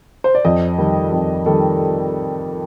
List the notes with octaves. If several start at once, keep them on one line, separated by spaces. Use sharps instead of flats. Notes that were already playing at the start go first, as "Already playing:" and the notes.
C5
D5
F2 D#5
D#3 G3
F2
D#3 G3 A4